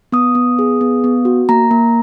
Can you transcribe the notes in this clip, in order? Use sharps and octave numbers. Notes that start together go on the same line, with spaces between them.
B3 D#6
B3
G#4
B3
B3
F#4
A#3 A#5
A#3